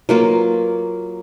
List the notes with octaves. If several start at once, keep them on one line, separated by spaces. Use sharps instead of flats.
F#3 A#3 F4